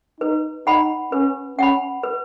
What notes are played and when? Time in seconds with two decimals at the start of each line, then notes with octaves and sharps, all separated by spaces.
0.21 D#4 B4
0.67 D#4 F#5 B5
1.12 C#4 B4
1.58 C#4 F#5 B5
2.03 B4